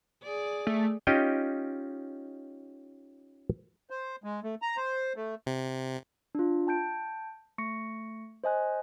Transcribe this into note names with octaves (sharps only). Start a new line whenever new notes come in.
G#4 D5
A3
C#4 D#4 F4 G4 D#5 G5
C5
G#3
A3
A#5
C5
A3
C3
D4 F4
G5 A5 G6 D7
A3 C#6 A#6 C#7
C5 D#5 G#5 F#6